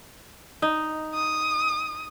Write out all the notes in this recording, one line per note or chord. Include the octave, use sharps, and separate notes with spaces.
D#4
D#6